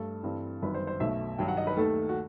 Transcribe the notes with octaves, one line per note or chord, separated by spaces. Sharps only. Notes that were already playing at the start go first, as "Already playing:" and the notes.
Already playing: G2 A3 A4
G2 E3 G3 C4
G1 F#2 D#3 B4
C5
C5
B1 B2 F#3 A3 E5
G2 D#3 F#3 G5
F#5
D#5
B4
D#2 D#3 A3 A4
F#4